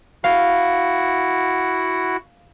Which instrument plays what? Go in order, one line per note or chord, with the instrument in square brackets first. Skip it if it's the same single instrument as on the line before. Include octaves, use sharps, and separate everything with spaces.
[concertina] E4 F#4 F#5 [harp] F5